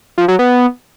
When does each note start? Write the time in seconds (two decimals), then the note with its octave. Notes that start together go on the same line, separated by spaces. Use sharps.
0.18 F3
0.28 F#3
0.39 B3